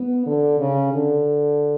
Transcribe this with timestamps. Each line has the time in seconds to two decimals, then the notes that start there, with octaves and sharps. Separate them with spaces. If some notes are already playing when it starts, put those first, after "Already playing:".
Already playing: B3
0.26 D3
0.59 C#3
0.92 D3